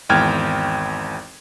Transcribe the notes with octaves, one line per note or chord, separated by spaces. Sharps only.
G#1 E2 G5 F6 G#6